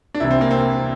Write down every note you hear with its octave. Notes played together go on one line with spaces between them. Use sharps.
D4
C2 C3 E3 E4
C4
A#3
C4